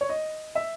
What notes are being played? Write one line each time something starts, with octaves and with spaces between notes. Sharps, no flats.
C#5
D#5
E5